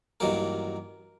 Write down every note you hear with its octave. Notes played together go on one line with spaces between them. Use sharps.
A1 G2 D#3 F#3 A#3 A#4